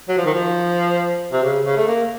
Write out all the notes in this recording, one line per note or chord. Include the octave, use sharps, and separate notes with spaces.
F#3
F3
D#3
F3
C3
C#3
C#3
A3
A#3